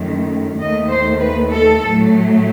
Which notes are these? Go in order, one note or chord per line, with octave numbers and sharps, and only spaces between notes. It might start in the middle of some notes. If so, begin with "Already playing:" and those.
Already playing: F#2 D#3 F#3 A3
D#2 D#3 A3 D#5
C5
B4
A4
A2 F#3 A3